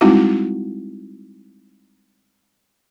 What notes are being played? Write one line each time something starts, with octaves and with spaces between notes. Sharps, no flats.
G3 G#3 C4 D#4 E4 F#4